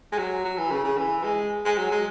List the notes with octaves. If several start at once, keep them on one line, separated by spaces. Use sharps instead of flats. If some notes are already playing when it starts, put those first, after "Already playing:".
G#3
F#3
F#3
E3
C#3
C#3
E3
G#3
G#3
F#3
G#3